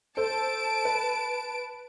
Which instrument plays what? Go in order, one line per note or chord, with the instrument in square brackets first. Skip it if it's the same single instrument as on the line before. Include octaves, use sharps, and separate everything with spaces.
[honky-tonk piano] A4 C5 [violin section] A5 D7
[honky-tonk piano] B4